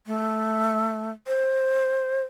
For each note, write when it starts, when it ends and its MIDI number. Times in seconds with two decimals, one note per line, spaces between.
0.07 1.10 57
1.27 2.23 72